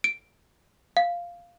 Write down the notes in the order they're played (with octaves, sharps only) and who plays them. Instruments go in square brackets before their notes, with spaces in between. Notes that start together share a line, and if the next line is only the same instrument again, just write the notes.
[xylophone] D7
F5